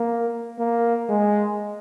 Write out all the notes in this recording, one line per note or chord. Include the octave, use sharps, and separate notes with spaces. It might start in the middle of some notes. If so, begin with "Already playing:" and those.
Already playing: A#3
A#3
G#3